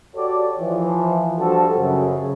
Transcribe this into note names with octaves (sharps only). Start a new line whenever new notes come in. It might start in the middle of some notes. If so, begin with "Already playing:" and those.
F#4 G4 A4 C#5 D5
E3 F3
F3 G3 D4 F#4 A4
F#2 C#3